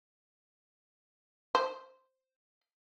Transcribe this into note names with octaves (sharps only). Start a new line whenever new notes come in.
C5